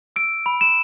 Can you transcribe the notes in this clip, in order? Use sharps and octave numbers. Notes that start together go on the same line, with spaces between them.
E6 D7
B5
E7